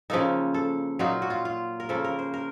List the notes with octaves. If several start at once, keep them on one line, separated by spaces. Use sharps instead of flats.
C#3 F3 A#3 D#4 A4
A4
A#2 F#3 A#3 D#4 F4
F#4
F4
F4
A#4
C#3 F3 A#3 A4
A#4
C5
A#4